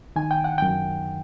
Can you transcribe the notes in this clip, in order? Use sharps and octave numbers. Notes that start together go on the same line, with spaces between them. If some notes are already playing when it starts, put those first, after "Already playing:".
D#3 G#5
G5
F#5
F#2 G5